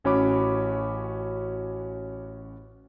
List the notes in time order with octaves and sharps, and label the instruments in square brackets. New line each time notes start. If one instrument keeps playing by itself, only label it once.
[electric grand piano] A1 C#4 F#4 C#5 B5 D6